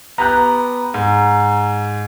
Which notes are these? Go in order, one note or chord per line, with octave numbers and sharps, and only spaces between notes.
B3 G4 A#5 F#6
G#2